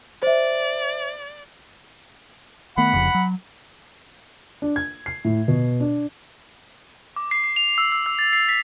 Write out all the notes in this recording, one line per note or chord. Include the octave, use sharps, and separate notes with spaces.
C5 D5 E5
D#3 A3 B3 F#5 B5
F1 F2 C#3
F#3
D4
G#6
C7
A2
B2
D4
D6
C7
C7
F7
E6
E6
E6
A6
C7
B6